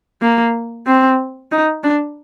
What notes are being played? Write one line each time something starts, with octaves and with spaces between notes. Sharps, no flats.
A#3
C4
D#4
D4